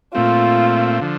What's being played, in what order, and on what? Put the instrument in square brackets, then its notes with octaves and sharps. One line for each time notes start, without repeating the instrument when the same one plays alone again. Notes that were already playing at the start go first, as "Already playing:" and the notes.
[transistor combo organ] A#2 A3 C4 [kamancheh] F4
[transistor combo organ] D3 F3